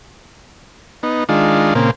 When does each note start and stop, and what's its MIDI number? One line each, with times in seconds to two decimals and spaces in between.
1.03 1.24 59
1.03 1.24 63
1.29 1.74 51
1.29 1.74 56
1.29 1.74 62
1.29 1.74 65
1.75 1.91 46
1.75 1.91 49
1.75 1.91 58
1.75 1.91 60